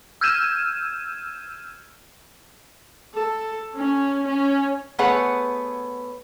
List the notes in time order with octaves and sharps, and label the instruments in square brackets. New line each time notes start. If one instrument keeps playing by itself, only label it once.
[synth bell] E6 F6 G6 G#6 D#7 E7
[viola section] A4
C#4
C#4
[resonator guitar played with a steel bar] A3 B3 G#4 B4 C#5 F#5